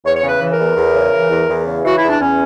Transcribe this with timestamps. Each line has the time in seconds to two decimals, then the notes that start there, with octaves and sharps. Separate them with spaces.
0.04 E2 C#5
0.16 C#5
0.23 C#3
0.28 B4
0.41 E3
0.53 A#4
0.58 E2
0.77 E2
0.94 C#3
1.12 E3
1.30 E2
1.49 E2
1.66 C#3
1.85 E3 F#4
1.97 E4
2.02 E2
2.09 D4
2.20 E2 C#4